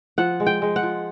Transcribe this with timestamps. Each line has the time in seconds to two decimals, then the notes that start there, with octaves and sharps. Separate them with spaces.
0.18 F3 F#5
0.40 G#3
0.47 G5
0.62 G#3
0.76 F#5
0.83 F3